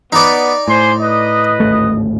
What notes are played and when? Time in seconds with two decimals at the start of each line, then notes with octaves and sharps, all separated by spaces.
0.12 B3 D#4 D5
0.68 A2 C5 G#5 C6
1.00 B4 D#5
1.60 D1 G#1 A3